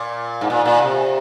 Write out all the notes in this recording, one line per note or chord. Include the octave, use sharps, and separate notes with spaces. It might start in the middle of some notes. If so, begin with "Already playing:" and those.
Already playing: A#2
G#2
A#2
A#2
C3